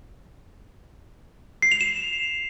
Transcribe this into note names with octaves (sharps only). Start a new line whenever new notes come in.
C7
F7
E7